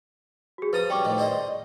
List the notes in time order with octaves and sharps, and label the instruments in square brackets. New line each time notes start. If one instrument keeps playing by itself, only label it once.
[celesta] F#4 G#4
[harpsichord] F3 A#5 D#6 [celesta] B4 A6 D#7
[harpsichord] G3 C#4 [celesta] G5 C#6 D6
[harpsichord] A2 D#3 F3
[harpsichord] G#4 C5 D#5 [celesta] D5